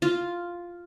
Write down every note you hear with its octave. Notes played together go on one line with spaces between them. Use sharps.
F4